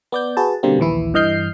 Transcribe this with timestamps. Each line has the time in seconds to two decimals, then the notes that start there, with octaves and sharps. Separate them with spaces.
0.12 B3 D5 G6
0.37 F#4 G#4 B4 A5
0.63 B2 D3 G3 A#3 C4
0.78 A#1 D#2 E3 E4
1.14 G2 E3 D#5 F6 G6 C7